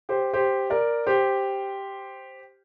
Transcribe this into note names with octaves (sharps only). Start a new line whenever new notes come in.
G4 C5
G4 C5
A#4 D5
G4 C5